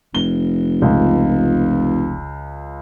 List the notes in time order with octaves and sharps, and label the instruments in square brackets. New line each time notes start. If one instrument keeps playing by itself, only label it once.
[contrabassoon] F1 [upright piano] G7
[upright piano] C#2